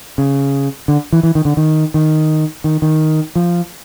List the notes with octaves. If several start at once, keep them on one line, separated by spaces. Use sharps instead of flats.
C#3
D3
E3
E3
D#3
D3
D#3
D#3
D#3
D#3
F3